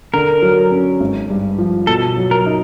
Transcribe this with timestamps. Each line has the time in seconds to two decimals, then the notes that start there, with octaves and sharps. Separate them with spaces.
0.14 D3 A#4
0.42 F#3
0.72 C#4
1.00 G#1
1.30 G2
1.58 F3
1.87 B2 A4
2.17 F#3
2.31 A#4
2.46 D#4